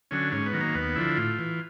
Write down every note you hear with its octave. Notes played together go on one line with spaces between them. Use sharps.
D3 F#3 C#4
G#2 C#4
B3
D#3 F#3
A#3
D#2 B3
D3 F3 E4
A2 F4
E3